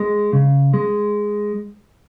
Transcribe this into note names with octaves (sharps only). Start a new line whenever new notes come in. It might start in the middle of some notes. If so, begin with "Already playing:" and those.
Already playing: G#3
C#3
G#3